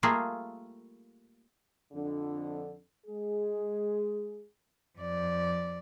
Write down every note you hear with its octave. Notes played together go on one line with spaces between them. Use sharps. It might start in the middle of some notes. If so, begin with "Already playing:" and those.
G3 A3 A#3 F4 G#4
F2 D3
G#3 G#4
F2 D5